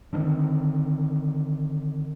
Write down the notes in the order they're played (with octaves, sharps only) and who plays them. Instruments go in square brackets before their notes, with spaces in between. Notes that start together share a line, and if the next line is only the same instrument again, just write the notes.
[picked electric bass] D3 D#3 A3 C4